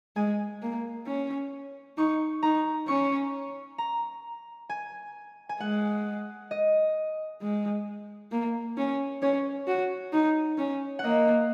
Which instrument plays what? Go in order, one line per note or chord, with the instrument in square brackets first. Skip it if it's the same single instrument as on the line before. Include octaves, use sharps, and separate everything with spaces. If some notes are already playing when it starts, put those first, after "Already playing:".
[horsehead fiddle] G#3 [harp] G#5
[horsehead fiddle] A#3
C#4
[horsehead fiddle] D#4 [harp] C#6
[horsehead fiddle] D#4 [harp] A#5
[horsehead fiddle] C#4 [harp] C#6
[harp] A#5
G#5
G#5
[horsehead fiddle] G#3 [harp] F#5
[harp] D#5
[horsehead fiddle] G#3
A#3
C#4
[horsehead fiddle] C#4 [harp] C#5
[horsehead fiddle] F#4
D#4
C#4
[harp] F#5
[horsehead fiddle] A#3 [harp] D#5